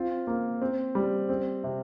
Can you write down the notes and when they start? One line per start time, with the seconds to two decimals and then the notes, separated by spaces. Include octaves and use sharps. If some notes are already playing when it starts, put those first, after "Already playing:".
Already playing: C4 F4
0.27 A#3
0.62 C4
0.95 G3
1.29 C4
1.64 C3